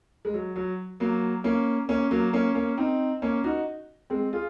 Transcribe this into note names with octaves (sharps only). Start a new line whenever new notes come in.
G#3
F#3
F#3
F#3 A#3
A#3 C#4
A#3 C#4
F#3 A#3
A#3 C#4
A#3 C#4
C4 D#4
A#3 C#4
D#4 F#4
G#3 C4
F4 G#4